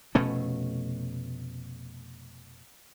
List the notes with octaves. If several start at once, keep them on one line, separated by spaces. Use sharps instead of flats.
F1 B2 A3 C#4